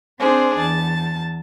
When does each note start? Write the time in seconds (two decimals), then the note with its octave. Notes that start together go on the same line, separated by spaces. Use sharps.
0.20 C4 D4 G#4 C5
0.57 E2 A5